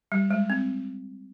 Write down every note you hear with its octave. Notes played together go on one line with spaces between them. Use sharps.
G3
G#3
C4